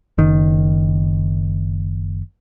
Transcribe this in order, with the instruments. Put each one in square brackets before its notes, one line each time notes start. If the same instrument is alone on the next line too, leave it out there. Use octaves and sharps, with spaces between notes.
[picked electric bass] F#1 D#3